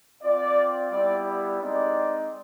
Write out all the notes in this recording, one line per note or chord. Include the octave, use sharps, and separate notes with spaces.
C4 F4 D5
G3 B3 E4 G4 D5
G#3 C4 D#4 D5